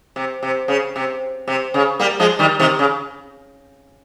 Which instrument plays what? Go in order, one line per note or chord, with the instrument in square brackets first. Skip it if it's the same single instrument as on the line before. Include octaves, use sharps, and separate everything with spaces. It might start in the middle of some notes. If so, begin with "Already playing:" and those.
[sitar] C3
C3
C#3
C3
C3
C#3
G3 A#3
F3 G#3
D#3 G3
C3 D#3
C#3